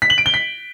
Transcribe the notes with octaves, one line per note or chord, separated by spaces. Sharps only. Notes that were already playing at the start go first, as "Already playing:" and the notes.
B6
F#7
D7
G7
B6